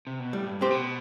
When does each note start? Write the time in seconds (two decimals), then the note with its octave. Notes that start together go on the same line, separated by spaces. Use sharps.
0.07 C3
0.19 B2
0.33 A2 G3
0.47 G2
0.61 A2 C4 G4 C5
0.70 C3
0.75 B2